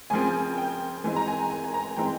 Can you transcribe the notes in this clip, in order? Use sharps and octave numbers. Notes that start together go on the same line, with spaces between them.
C#3 F3 C4 G#5
G5
E3 G#3 C4 G#5
A#5
G#5
G#5
G#5
A#5
E3 G#3 C4 G5